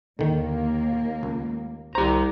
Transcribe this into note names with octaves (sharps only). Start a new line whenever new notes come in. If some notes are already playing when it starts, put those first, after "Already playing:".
D#2 D3 D#3 A#3
C#2
C2 G4 C5 A#5